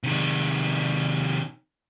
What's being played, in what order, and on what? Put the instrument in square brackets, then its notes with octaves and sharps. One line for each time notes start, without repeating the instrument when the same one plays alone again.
[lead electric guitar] C3 D#3